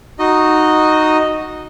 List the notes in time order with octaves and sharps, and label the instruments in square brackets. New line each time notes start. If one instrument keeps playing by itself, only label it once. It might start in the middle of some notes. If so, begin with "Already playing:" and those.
[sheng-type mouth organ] D#4 F#4 D#5